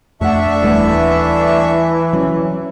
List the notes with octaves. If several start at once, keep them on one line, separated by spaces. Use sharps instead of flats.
F2 A3 D4 E5 F#5 C#6
D#1 E3 G3 A3 B3
F#3 C#4